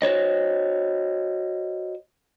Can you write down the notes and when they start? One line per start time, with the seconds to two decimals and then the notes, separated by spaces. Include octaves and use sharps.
0.02 F#4 C5 C#5 D#5